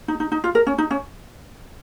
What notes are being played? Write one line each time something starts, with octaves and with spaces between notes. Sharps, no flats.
D#4
D#4
D#4
F4
A#4
C#4
D#4
C#4